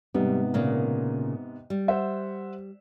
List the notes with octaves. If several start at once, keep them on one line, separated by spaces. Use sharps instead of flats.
G#2 C3 G3 B3
A#2 C#3 A#3
G3
C5 E5 F#5